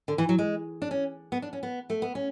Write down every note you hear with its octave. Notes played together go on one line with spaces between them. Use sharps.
D3
E3
F#3
G#3
D4
C#4
B3
D4
C#4
B3
A3
B3
C#4